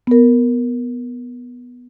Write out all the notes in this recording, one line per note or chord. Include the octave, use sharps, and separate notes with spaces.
B3 A#4